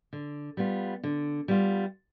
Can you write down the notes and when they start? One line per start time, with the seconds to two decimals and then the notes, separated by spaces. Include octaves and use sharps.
0.13 D3
0.57 G3 B3 F4
1.03 D3
1.48 G3 B3 F4